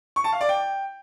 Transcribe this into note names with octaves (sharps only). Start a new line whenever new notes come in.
C#6
A5
F5
D5
G5